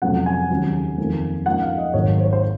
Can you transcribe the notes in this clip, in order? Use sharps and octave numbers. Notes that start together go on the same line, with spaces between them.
F2 C3 F#3 C#4 F#5
G#5
D#2 C#3 F#3 C#4
F2 D#3 A#3
F#2 F3 A#3 D#4 F#5
F5
D#5
G#1 G#2 D#3 F#3 A#3 C#5
C5
C#5
C5